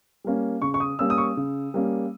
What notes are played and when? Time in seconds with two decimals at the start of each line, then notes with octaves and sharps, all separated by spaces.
0.24 G3 A#3 C#4
0.62 C#3 C#6
0.74 C#6
0.80 D#6
0.99 G3 A#3 C#4 E6
1.10 D#6
1.18 C#6
1.37 C#3
1.74 G3 A#3 C#4